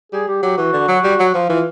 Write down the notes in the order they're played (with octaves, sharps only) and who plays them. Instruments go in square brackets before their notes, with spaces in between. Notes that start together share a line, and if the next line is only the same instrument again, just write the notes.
[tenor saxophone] G3 [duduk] G#4
[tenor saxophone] G3 [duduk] G4
[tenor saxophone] F#3 [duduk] G4
[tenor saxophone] E3 [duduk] F#4
[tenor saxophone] D3
F#3
G3
F#3
[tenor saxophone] F3 [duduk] F4
[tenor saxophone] E3 [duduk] F4